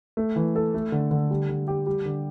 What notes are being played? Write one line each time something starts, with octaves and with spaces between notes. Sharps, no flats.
A3
E3
A4
A3
D3
D3
G3
D3
G4
G3
D3